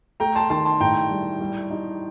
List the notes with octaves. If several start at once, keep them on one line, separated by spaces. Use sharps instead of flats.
A3 G5 A#5
A5 C6
D#3 A5 C6
A5 C6
A2 G5 A#5
G3
G3
D#4